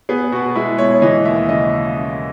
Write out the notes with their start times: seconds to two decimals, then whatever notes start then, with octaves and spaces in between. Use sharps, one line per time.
0.09 B3 G#4
0.32 B2 F#4
0.55 G#3 E4
0.78 B2 C#5
1.02 E3 D#5
1.25 D#2 E5
1.48 C#3 D#5